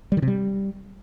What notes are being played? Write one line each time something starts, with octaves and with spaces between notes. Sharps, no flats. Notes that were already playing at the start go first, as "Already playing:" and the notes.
G3
D#3
C3
G3